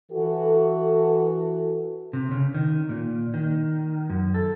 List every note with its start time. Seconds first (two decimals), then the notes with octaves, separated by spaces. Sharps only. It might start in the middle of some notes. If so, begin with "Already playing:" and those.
0.12 E3 F#4 A4
2.13 C3
2.31 C#3
2.54 D#3
2.89 A#2
3.34 D#3
4.10 F#2
4.34 A4